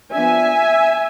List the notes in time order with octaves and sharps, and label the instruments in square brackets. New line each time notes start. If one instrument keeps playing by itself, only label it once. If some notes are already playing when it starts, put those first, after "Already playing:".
[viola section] F3 B3 D4 E5 G#5